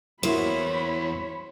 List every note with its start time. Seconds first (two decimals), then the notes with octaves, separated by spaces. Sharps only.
0.23 E2 E3 A#3 E4 F#4 C5 C#5 B5